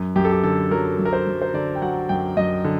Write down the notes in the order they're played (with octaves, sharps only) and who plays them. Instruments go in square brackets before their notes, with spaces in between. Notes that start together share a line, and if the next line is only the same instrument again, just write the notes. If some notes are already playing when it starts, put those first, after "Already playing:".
Already playing: [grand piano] F#2
F#2 G4
A4
G4
D3 A4
F#3 A#4
F#2
A#4
C5
F#2
C5
D3 D5
G5
F#3 F#5
F#2 G5
F#2 D#5
D3